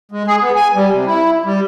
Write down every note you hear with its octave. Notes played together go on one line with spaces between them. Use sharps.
G#3
G#4
B3
G#5
G3
C3
E4
G3